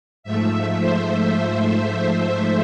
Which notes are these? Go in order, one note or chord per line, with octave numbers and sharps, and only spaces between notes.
G#2 F3 A3 E5
C5